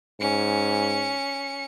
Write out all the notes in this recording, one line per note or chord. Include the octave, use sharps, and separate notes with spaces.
G#2 C#4 C#7